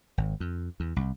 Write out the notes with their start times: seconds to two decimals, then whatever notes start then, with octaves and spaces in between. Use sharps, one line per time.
0.18 G#1
0.40 F2
0.80 E2
0.96 C2